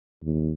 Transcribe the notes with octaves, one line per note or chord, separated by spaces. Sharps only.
D#2